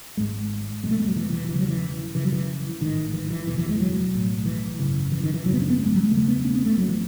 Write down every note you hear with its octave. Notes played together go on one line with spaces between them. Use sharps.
G#1 G#2 G#3
E1 E2 B2 G#3
A3
G#3
F#3
E3
E3
E1 E2 C#3 E3
F#3
E3
F#1 F#2 C#3 E3
F#3
E3
A1 G#2 D#3
E3
E3
F#1 E2 B2 E3
E3
G#3
F#3
B1 A2
E3
G#1 F#2 C#3
E3
D#3
E3
G#1 F#2 C#3 F#3
B3
C#4
B3
A3
G#3
F#3
G#3
E1 E2 C#3 A3
B3
C#4
B3
A3
G#1 G#2 F#3
E3